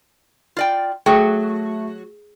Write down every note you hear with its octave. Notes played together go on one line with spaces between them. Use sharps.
F4 D5 G5
F#3 A3 F#4 G#4 G5 D#6